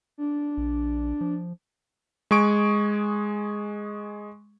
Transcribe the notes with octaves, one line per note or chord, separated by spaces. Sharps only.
D4
A#1
F3
G#3 G#4 C#6 D7